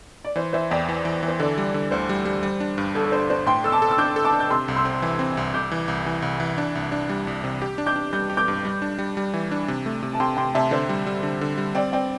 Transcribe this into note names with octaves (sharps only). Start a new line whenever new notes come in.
D5
E3 C5
E3 C5 E5
E2 D5 G5
E3
E3
E3
C5
D3 A4 D5
G3
D3
D2 C5
G3
G3
G3
D4
G2
G1 A4
A4
D4 C5
D4 C5
A2 G5 C6
A4 E6
A5 D6
A4
E6
D4 D6 G6
A4
A5 D6
D4
G6
C3 C6 E6
C2
C6 E6
C4
E3
C4
C2
C2 D6 G6
E3
C2
E3
C2
E3
D4
C2
D4
G3
C2
C3
G4
D4
D6 G6
D4
G3 G6
G4
D6 G6
G2
G3
D4
G3
G3
E3
D4
C3
A3
C3
A5
C3 G5 C6
C3 G5 C6
C3 E5 A5
D3 C5 E5
G3
G3
D3
D3
G3
C4 D5 G5
C4 D5 G5